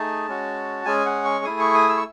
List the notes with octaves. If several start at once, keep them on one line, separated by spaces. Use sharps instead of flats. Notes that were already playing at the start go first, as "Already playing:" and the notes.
Already playing: A3 D#4 G#4 A5
G#3 C#4 F#4
G#3 C#4 G#4 G#5
F#5
C#6
A3 E4 G#4 D#6
C#6
D#6
E6
C#6